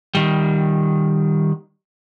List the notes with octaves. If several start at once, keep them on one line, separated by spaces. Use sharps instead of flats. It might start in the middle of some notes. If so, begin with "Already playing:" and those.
D#3 G3